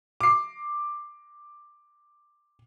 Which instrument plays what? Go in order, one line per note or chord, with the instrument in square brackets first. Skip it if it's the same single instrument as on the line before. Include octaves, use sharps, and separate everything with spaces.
[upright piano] D6 C7